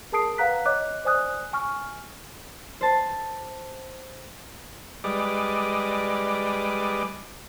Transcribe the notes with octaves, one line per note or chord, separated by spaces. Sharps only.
G#4 A#4 A5 D#6 C7 D7
B4 F5 F#5 A#5 F#6 B6
C#5 D#5 D6 F#6
C5 D5 G#5 D#6 F#6
G#5 C#6 F6
C5 A5
G3 G#3 B4 D5 D#5 D6